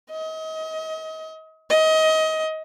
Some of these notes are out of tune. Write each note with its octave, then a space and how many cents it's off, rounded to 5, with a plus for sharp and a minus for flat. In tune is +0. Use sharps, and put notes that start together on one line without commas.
D#5 +35
D#5 +25